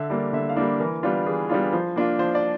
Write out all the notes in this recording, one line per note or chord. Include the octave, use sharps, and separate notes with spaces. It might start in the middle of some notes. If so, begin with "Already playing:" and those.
Already playing: D3 E5
G3 A#3 D4
D3 E5
F5
G3 A#3 D4
E3 A#4
G3 B3 D4 F4
E3 G#4
G3 B3 D4 F4
F3 C5
A#3 D4 F4
F3 C5
D5